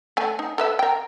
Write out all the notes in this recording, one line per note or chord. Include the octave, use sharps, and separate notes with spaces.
A3 G#5
D#4
A4 B4 E5
A#4 G5